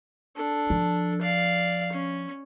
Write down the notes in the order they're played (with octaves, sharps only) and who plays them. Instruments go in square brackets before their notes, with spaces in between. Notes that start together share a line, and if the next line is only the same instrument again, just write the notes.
[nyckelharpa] D4 A4
[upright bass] F3
[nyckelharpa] D5 F5
C#4